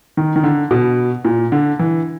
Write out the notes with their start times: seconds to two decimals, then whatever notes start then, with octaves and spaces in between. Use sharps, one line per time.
0.17 D#3
0.36 D#3
0.44 D3
0.71 B2
1.25 A#2
1.52 D3
1.79 E3